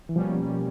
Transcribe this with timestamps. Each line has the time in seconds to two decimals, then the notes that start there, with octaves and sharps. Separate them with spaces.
0.09 E3
0.16 B2 F3 G3 A#3 C#4